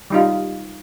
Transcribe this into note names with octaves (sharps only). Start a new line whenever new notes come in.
G3 D#4 F4